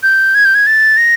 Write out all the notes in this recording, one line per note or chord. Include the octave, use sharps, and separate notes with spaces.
G6
G#6
G6
G#6
A6
A#6